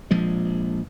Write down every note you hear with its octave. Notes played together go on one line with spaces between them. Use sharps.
A#1 F3 G#3